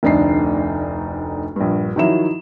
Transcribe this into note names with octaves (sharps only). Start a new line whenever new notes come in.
F1 D2 D4 D#4 C7
A#1 G2
D#3 F3 F#3 E4 E7